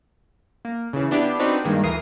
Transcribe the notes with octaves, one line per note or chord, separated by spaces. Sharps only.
A#3
C#3 E3
B3 D4 E4 G4 B4
C4 D4 D#4 F#4 G4 B4
G2 D#3 G#3 A#3
D2 E3 A#4 D#6 C7